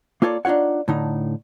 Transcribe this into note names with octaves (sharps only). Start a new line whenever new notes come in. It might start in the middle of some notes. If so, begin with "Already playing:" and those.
A#3 F4 A4 C#5 D5
D4 D#4 F4 C#5 F#5
A2 D3 D#4